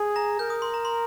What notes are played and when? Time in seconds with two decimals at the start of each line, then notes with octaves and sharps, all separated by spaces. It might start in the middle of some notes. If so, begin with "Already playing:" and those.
Already playing: G#4
0.16 A#5 A#6
0.39 A#4 G6
0.50 D#6
0.62 C6
0.74 A#5
0.85 C6